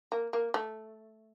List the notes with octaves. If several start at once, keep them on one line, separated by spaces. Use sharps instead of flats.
A#3
A#3
A3